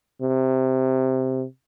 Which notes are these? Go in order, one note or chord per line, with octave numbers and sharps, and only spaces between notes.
C3